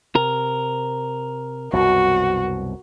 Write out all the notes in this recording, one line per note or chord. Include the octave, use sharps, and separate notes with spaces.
C3 A#4
C2 F#2 B2 F#4